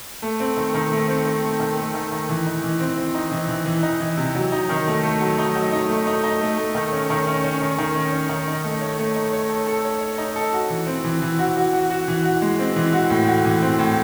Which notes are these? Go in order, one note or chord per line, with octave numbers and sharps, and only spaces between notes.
A3
C4
D#3
D#3
A3
C4
C4
A3
D#3
A3
D#3
D#3
E3
D#4
E3
C4
C4
D#4
E3
E3
E3
D#4
E3
C3
F#3
D#4
D#3
A3
A3
F#3
D#4
F#3
D#4
A3
D#4
D#4
A3
A3
D#3
C#4
D#3
C#4
C#4
D#3
D#3
C#4
C#4
D#3
D#4
A3
C#5
A3
D#4
C#5
A4
A4
C#5
C#5
D#4
A4
F#4
E3
C4
E3
E3
F#4
F#4
F#4
F#4
E3
F#4
G#3
C4
E3
F#4
A2
F#4
E3
C4
A2